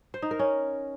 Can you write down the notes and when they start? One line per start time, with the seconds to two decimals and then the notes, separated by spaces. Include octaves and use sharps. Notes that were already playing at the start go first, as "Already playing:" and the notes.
0.14 C5
0.22 D#4
0.31 A#4
0.39 C#4